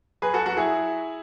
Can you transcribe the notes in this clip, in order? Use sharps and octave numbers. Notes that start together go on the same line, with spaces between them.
F#3 G#4 B4
F#4 A4
F#3 F#4
E4 G#4